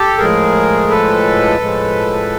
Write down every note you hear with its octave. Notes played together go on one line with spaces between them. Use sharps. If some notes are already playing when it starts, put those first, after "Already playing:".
Already playing: G4 A4
A2 F3 G#3 G#4 A#4
A4 B4
A2 F3 G#3